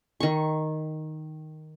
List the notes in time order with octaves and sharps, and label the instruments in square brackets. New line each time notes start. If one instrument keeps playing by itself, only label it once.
[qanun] D#3 C#6